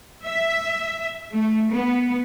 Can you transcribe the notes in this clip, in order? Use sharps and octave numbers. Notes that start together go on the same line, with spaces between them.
E5
A3
B3